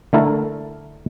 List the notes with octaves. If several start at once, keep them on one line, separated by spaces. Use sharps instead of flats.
D3 A3 E4 A#4 A5